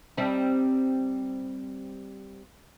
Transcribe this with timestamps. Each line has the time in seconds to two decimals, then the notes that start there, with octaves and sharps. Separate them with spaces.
0.17 G3 C4 D#4